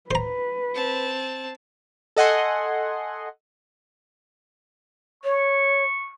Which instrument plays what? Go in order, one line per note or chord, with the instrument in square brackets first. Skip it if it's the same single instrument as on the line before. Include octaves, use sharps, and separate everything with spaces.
[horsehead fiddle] B4 [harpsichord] C5 A#5
[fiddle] C4 A5
[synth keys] A4 D#5 F#5 G#5 C6
[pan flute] C#5 [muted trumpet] C#6